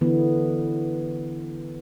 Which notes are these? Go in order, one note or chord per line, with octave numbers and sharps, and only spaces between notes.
D3 E3 B3